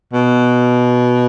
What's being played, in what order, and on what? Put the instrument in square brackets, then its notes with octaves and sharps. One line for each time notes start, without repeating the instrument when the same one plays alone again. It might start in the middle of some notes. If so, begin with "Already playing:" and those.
[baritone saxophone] B2